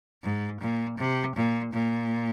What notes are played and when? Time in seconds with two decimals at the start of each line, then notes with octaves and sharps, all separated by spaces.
0.23 G#2
0.61 A#2
0.98 C3
1.36 A#2
1.73 A#2